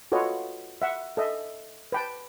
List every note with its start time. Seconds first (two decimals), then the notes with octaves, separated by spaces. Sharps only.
0.12 F4 F#4 A4 B4 C#5 D#5
0.82 E5 F#5
1.17 A4 D#5 E5
1.92 B4 G5 A5